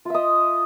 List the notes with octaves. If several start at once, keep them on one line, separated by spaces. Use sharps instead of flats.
F4 D#5 E5